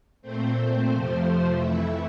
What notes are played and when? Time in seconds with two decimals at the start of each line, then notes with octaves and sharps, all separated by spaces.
0.22 A#2 A3 C4 C5
0.89 F2 C3 F3 A3
1.56 F2 E3 A3 E4 E5